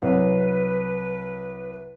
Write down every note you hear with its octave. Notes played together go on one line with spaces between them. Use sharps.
C2 F#3 B4